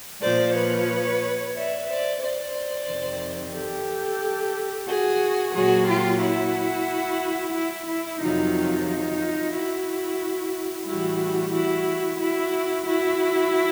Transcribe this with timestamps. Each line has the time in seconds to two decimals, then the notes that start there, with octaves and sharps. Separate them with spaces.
0.22 A#2 F3 C5 D5
0.55 B4 C#5
1.54 D5 E5
1.88 C5 D5
2.21 C5 D5
2.87 F2 C3 D#3
3.54 G4 A4
4.87 F#4 G#4
5.54 A#2 F#3 F#4 G#4
5.88 F4 G4
6.21 E4 F#4
7.54 E4
7.87 E4
8.21 F2 C3 D#3 F#3 D#4 F4
8.87 D#4 F4
9.53 E4 F#4
10.86 A2 E3 G3 E4 F#4
11.53 E4 F#4
12.19 E4 F#4
12.86 E4 F#4